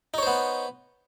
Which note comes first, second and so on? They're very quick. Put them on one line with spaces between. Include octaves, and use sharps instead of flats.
D#4 C#5 C5 B3